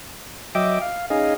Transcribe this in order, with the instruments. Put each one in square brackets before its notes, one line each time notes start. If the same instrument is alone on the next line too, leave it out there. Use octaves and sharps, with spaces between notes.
[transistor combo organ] F#3 D#5 E5 G5 D6
F5
C#4 D#4 G#4 D#5 F5